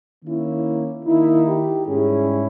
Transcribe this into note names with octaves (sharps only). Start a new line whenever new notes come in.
D#3 A#3 C#4 E4
D#3 A#3 D#4 E4
G4
G#2 G3 C#4 E4 G#4